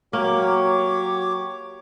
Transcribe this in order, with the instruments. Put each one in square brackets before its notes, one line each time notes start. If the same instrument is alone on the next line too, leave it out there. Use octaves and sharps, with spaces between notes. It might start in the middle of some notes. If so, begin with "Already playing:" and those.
[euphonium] F#3 [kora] A#3 [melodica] G4 C#5 D6